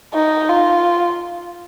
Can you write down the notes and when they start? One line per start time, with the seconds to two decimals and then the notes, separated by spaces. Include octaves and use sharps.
0.14 D#4
0.48 F4